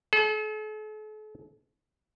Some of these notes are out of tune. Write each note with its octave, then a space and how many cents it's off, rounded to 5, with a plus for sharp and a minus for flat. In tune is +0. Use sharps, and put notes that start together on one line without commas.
A4 -45